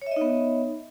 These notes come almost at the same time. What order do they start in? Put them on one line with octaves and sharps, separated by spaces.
C#5 E5 D#5 D#4 B3